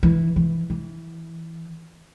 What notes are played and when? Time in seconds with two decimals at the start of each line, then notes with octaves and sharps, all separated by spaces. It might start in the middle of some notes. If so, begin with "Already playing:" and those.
0.03 E3
0.36 E3
0.70 E3